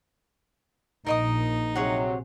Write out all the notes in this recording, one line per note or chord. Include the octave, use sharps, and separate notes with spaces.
A#1 D#4 A#4 D#5 D#6
C3 F#3 G#4 C#5 F#5